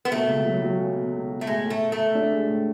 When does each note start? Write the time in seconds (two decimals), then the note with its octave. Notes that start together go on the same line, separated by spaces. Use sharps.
0.05 B3
0.11 B2 A3
0.27 C#2
0.45 F#3
0.62 F#3
0.79 C#4
0.96 B2
1.13 B2
1.30 B2
1.41 A3
1.47 A2 G#3
1.64 A2
1.70 A3
1.81 A2
1.92 A3
1.98 A2
2.15 D4
2.32 G#3
2.48 A2